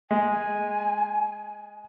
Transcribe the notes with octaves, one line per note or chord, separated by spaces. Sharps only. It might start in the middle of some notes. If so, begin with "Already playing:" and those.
G#3 G#5